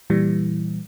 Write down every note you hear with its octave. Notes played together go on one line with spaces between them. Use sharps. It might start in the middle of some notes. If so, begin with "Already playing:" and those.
A#2 E3 G3